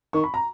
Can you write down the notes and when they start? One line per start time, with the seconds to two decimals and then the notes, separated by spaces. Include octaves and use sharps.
0.13 D#3 C#6
0.24 B5
0.34 A#5